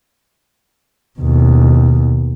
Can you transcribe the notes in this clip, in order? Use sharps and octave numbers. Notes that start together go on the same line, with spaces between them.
D#2 B2